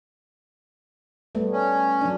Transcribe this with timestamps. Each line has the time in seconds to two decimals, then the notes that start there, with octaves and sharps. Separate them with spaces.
1.35 G3 A3 B3
1.52 C#4
2.01 F#3 D4